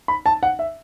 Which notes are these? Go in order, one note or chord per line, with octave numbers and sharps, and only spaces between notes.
B5
A5
F#5
E5